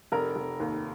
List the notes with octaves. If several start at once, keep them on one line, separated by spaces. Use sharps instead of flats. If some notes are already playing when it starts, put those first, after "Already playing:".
F1 A#4
F1
D#2